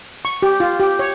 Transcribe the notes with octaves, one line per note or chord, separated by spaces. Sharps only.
C#6
G4
F4
G4
C#5